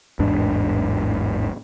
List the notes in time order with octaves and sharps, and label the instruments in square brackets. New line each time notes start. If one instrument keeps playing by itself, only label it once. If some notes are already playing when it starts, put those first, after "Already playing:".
[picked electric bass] A1 E2 G#2 D4